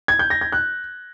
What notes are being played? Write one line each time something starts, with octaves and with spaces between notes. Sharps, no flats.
G#6
G6
A#6
G#6
F#6